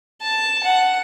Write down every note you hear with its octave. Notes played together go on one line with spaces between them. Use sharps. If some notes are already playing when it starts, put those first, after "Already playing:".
A5
F#5